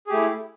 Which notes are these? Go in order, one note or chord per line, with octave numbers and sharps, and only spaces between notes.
A3 E4 G4 G#4